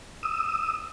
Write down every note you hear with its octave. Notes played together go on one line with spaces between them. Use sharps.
D#6 E6